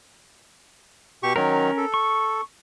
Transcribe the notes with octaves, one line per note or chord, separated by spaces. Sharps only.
B2 G4 C#6
D#3 F#3 C#4 A#4
A4
C#6